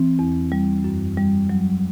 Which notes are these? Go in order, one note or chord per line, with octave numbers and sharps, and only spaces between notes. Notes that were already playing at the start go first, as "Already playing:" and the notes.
Already playing: E3 C4
E2
G3
F#2
G3
F#3